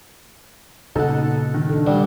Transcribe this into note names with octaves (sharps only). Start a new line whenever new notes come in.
B1 A#2 C#3 D#4 A4 F#5
D#3
D4 A4
G2 D3 G3